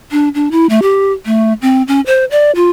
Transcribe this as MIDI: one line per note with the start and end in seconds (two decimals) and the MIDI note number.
0.12 0.29 62
0.35 0.51 62
0.51 0.66 64
0.70 0.80 57
0.82 1.12 67
1.26 1.53 57
1.62 1.83 60
1.88 2.01 61
2.06 2.25 72
2.31 2.51 74
2.55 2.70 65